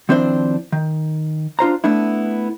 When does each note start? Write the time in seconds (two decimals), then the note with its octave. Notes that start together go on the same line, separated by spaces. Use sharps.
0.09 D#3 F3 C4 D4 E4 C5
0.72 D#3
1.59 D4 F4 C5 A#5
1.84 A3 B3 D4 E4